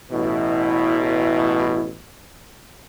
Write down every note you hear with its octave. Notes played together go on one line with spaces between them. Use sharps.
A1 B2 E4